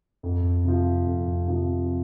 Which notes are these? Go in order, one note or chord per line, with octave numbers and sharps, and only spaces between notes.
F2
C3 F3
F2
C3 F3